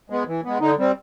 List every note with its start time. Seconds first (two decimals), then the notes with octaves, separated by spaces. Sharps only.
0.10 G#3 B3
0.27 E3
0.45 G#3 B3
0.61 D3 D#4
0.78 G3 C4